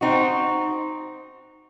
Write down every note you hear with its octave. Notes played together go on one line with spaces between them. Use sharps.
C4 D#4 F#4